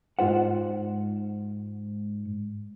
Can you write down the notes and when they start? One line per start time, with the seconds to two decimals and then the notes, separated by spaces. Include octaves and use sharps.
0.19 G#2 F4 C5 F#5